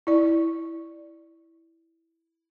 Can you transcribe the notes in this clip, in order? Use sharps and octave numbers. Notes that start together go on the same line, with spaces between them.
E4 D5